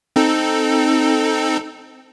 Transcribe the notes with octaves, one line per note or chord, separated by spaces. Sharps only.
C4 D#4 A4